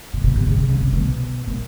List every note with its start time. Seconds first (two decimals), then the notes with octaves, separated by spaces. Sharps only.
0.14 B2
0.24 B2
0.36 C3
0.47 C#3
0.58 C#3
0.69 C#3
0.80 C3
0.93 A#2
0.98 B2
1.47 A#2